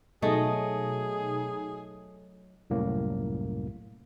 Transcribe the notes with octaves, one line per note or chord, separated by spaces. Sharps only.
B2 F#3 A3 D#4 G#4 D#5
C2 F#2 A2 A#3